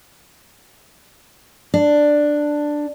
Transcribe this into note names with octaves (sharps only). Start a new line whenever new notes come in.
D4